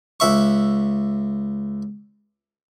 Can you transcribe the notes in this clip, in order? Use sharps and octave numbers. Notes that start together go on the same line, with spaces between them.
C#2 E5 C#6